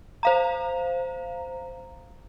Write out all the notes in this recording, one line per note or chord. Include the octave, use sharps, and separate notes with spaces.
C5 F5 A#5